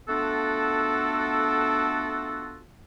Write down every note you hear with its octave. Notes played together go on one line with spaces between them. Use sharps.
A3 B3 D4 F4 F#4 A4